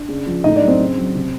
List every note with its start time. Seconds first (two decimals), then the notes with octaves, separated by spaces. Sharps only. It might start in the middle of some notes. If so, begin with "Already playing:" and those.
Already playing: D4 D5
0.08 C#3
0.26 F3
0.44 A2 D#4 D#5
0.56 D4 D5
0.62 F#3
0.68 C4 C5
0.80 C#3
0.98 F#3
1.15 C3